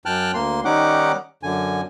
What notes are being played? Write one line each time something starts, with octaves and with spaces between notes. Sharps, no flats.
F#2 G5 A5 F6 F#6
D2 A#3 C6
D#3 G3 C#4 D#4 F#5 D6
F#2 D3 G#5